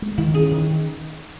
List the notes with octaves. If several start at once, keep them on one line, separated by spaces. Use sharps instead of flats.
G#3
D#3 E4
C#4 G#4
D#3